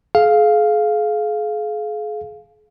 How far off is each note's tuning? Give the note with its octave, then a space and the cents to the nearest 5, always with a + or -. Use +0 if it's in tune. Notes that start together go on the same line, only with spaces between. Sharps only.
G#4 +40 F5 +0